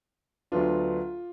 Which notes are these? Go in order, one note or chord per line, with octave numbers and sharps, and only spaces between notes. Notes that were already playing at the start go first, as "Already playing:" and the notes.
D2 D3 F#3 B3 D4 F4